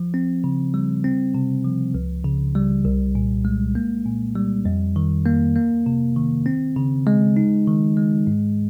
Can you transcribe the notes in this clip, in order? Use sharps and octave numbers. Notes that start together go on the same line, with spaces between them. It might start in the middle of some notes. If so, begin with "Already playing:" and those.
Already playing: F3
C4
C#3
G3
C4
C3
F3
C#2
C#3
G3
C2
A#2
G#3
A#3
A#2
G3
F2
D#3
A#3
A#3
C3
D#3
C4
C#3
G#3
D#4
D#3
G#3
G#2